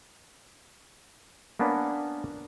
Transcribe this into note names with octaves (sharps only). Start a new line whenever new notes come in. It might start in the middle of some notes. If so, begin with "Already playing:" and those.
A#3 B3 C#4 D4 B4